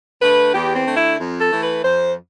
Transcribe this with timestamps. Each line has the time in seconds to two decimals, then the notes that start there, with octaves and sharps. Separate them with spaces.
0.21 D3 A3 B4
0.54 E2 G4
0.76 C4
0.86 D3 A3
0.97 E4
1.19 F2
1.41 A4
1.52 E3 A3
1.62 B4
1.84 F2 C5